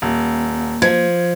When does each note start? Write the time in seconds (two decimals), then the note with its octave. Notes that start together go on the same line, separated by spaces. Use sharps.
0.02 D#1 A#3
0.82 F3 G#6